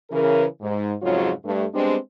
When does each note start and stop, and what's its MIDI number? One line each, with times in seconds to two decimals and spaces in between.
0.10 0.45 49
0.10 0.45 52
0.10 0.45 70
0.61 0.92 44
1.02 1.30 41
1.02 1.30 44
1.02 1.30 49
1.02 1.30 54
1.02 1.30 65
1.02 1.30 73
1.44 1.64 43
1.44 1.64 57
1.73 1.95 55
1.73 1.95 56
1.73 1.95 59
1.73 1.95 60
1.73 1.95 62